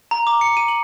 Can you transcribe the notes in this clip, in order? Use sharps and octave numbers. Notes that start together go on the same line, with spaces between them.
A#5
D6
C#7
D#7
F#7